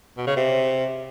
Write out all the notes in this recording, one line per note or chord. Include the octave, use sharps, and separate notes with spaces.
B2
C#3
C3